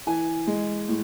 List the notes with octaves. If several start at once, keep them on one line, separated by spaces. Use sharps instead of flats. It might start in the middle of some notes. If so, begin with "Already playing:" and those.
E3 G#5
G#3
A2